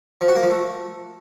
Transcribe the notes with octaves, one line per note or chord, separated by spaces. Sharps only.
F3
F#4
A#3
F3
A3